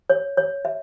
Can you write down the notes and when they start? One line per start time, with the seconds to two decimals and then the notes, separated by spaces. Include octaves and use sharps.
0.10 C#5
0.37 C#5
0.65 E5